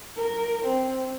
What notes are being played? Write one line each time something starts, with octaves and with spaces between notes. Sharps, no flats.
A#4
C4